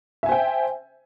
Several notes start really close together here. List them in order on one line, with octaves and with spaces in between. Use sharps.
E5 G#5 C5 G5